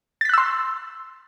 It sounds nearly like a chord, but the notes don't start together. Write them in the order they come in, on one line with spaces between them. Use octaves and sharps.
A6 B6 F#6 E6 C6